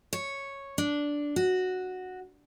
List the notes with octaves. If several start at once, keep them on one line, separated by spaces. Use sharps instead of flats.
C#5
D4
F#4